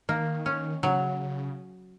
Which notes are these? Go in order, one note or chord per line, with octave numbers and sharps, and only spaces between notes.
D#3 A#3
C#4
C#3 F#3